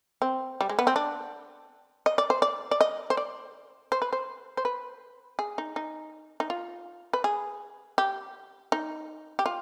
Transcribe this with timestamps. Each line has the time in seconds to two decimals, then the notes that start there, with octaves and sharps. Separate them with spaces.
0.22 C4
0.61 G3
0.69 G#3
0.79 B3
0.87 C4
0.96 D4
2.06 D#5
2.18 D5
2.30 C5
2.42 D5
2.71 D5
2.81 D#5
3.10 C5
3.17 D5
3.92 C5
4.02 B4
4.13 C5
4.57 C5
4.65 B4
5.39 G#4
5.58 D#4
5.76 D#4
6.40 D#4
6.50 F4
7.13 B4
7.24 G#4
7.98 G4
8.72 D#4
9.39 G4
9.46 F4